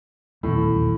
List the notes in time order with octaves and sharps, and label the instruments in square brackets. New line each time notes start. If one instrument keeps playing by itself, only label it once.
[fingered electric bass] D#1 B1 E2 [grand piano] A2